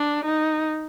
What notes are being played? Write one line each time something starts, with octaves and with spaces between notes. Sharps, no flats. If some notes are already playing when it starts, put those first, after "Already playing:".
Already playing: D4
D#4